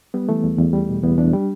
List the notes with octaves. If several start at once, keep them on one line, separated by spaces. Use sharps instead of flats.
G3 B3
E3 A3
E2
E2
G3
B2
E2 B3
E2 D4
G3